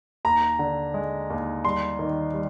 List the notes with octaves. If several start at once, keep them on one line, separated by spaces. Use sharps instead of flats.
D#2 A#5
D3
G#3
D#2
G3 C6
D#3
G3